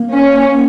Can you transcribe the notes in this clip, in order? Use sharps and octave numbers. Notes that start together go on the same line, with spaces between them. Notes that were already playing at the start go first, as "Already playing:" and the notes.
Already playing: A#3
C#4